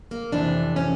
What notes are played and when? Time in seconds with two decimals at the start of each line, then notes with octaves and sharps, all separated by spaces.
0.11 A#3
0.32 F2 C3 E3 D4
0.76 C#4